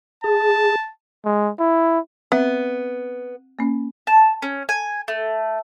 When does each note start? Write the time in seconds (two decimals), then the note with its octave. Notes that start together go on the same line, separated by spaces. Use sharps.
0.24 G#4 A5
1.25 G#3
1.60 E4
2.32 B3 C4 E5
3.59 A#3 C#4
4.07 A5
4.42 C#4
4.69 G#5
5.08 A3